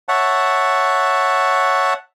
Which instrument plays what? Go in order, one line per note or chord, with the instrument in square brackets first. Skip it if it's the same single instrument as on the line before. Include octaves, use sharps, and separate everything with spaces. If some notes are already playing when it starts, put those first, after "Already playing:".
[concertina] C#5 E5 F#5 A5